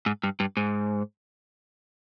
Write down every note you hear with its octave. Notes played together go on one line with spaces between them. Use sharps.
G#2
G2
G2
G#2